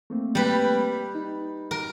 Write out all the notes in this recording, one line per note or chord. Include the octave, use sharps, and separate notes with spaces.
A3 A#3 C4
G3 B4
D#4
A#4